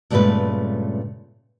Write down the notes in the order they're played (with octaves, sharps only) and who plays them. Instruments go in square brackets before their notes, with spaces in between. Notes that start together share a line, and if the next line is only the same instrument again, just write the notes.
[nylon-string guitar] G2 A#2 C#3 G#3 A3 B4